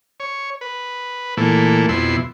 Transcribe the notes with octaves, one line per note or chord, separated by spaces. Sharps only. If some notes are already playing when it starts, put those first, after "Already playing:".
C#5
B4
A#2 E3 A3
F2 B2 E4 C6